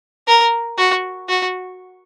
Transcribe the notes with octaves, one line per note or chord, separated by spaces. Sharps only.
A#4
F#4
F#4